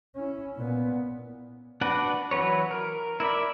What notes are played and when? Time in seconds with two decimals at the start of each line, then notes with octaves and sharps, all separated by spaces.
0.16 C#4 E4
0.56 A#2 B3
1.81 D4 F#4 B4 D5 F#5
2.31 E3 F#3 F#4 B4 C#5
2.71 A#4
3.20 E4 A#4 D5 E5